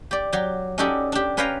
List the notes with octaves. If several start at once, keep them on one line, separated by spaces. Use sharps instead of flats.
G4 D5
F#3 G4
C#4 D#4 F#4 G4 A4 D5
D4 G4
C#4 B4 C#5 F5 G5 A#5